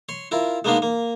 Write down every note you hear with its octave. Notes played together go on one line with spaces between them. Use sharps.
C#5 C6
E4 F4 A#4
G#3 A#3 B3 D4 D#4 F5
A#3